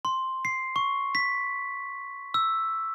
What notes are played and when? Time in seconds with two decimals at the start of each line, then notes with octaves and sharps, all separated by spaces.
0.05 C6
0.45 C7
0.76 C#6
1.15 B6
2.34 E6